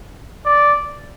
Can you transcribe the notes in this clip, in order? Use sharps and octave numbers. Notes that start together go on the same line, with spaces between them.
D5